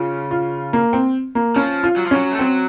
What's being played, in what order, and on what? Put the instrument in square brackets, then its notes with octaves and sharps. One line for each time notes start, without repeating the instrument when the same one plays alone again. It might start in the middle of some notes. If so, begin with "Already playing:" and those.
Already playing: [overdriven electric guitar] C#3 [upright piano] F4
[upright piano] F4
A#3
C4
A#3
[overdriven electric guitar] F3 [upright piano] C#4
[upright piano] F4
[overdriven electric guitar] F#3
F3
[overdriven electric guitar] F#3 [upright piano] C#4
[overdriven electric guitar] A3
[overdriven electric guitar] F#3 [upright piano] C4